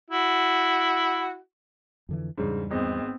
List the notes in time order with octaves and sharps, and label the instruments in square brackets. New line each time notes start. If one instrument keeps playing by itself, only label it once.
[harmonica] E4 F#4
[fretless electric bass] F2 D3 E3
[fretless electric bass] E2 G3 D4 [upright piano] G#2 C#3
[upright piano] G#1 G#3 D#5 [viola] B3 C4